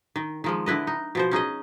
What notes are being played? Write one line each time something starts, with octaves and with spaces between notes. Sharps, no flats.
D#3
D#3 F3 G#3
D3 E4 B4 D#5
D#4
B2 F3 C5
C#4 D#4 G#4 D#5